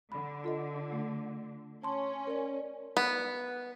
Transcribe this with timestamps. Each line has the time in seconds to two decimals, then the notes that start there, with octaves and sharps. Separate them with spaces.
0.12 D3 B5
0.44 F4 A4 D#5
0.92 A3
1.84 C#4 A5 C6
2.27 A#4 D5
2.97 B3